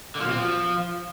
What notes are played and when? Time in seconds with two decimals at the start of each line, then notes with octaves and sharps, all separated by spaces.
0.15 D3
0.20 F3
0.26 B2
0.31 C4
0.36 F3